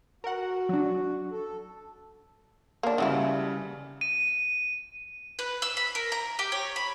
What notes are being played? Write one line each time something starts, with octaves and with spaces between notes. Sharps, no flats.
F#4 A#4 F#5
F#3 D4
A4
A#3 D4
C#3 E3 F#3 G3 E4
D#7
B4
E6
B5
A#4
A#5
G4
C#5
B5